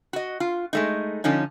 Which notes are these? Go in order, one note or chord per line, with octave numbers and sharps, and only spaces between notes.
F#4 D#5
F4
G#3 A3 D#4
D3 F3 C#4 D#4